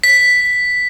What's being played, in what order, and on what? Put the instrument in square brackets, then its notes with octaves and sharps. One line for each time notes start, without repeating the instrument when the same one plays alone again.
[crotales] B6